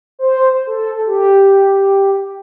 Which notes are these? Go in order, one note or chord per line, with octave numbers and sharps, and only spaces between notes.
C5
A4
G4